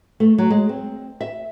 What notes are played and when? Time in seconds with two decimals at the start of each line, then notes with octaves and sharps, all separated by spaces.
0.20 A3
0.38 F#3
0.50 G#3
0.69 C4
1.21 E5